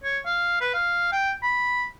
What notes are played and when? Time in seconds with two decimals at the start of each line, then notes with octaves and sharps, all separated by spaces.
0.04 C#5
0.26 F5
0.61 B4
0.74 F5
1.12 G5
1.43 B5